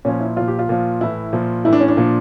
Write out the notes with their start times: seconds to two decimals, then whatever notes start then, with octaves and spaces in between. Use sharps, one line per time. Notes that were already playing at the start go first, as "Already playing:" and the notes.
0.05 A#2 F3 C#4
0.20 E4
0.36 A#2 F3 F4
0.48 G4
0.59 F4
0.69 A#2 F3
1.01 A2 E3 E4
1.33 A#2 F3
1.65 A2 E3 E4
1.73 D4
1.80 C#4
1.88 D4
1.97 A#2 F3